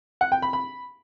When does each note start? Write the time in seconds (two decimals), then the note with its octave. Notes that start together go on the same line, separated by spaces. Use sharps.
0.21 F#5
0.32 G5
0.42 B5
0.53 B5